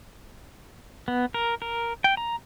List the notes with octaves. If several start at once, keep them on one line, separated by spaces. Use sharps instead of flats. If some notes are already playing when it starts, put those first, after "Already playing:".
B3
A#4
A#4
G5
A#5